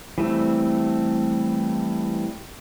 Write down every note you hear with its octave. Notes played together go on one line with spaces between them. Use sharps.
E3 G3 A3 C4